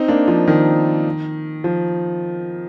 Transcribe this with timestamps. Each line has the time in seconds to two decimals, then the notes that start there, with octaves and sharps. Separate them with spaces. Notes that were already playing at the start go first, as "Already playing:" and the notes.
Already playing: C4 D#4
0.08 A#3 D4
0.28 F3
0.47 D#3
1.64 F3